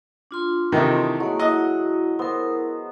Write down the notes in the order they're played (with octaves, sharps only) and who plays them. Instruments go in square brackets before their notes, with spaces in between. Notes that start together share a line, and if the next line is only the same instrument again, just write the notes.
[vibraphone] D4 F4 C6
[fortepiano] C3 D#3 E3 [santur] A3 E4 D#5
[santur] F#3 G#3 F#5 [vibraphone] A#3 C#6
[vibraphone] E4 F#4 [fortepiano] D#5
[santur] B3 C5 [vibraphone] E4 A#4